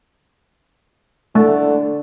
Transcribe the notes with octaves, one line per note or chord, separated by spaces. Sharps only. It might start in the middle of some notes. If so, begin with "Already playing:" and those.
D3 A3